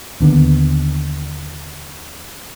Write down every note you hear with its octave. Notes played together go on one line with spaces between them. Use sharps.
D#2 D3 B3